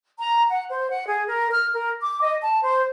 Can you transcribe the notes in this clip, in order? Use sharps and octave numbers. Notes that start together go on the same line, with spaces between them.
A#5
F#5
C5
F#5
G#4
A#4
F6
A#4
D6
D#5
A5
C5